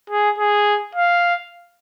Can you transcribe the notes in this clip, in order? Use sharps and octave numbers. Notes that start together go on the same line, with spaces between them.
G#4
G#4
F5